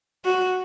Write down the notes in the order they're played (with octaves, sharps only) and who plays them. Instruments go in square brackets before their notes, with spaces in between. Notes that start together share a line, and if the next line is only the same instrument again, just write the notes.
[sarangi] F#4